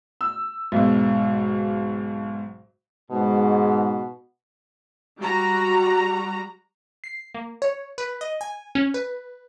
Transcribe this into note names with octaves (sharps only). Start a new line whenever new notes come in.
E6
B1 G#2 B2
G#2 B2
G3 F#4 A#5
C7
A#3
C#5
B4
D#5
G#5
C#4
B4